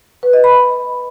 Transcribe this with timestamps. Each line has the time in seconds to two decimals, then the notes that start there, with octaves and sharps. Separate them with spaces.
0.23 B4
0.33 D#5
0.44 B5